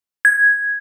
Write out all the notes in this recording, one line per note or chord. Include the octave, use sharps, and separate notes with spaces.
G#6